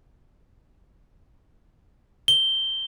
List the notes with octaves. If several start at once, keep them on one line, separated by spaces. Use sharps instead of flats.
G7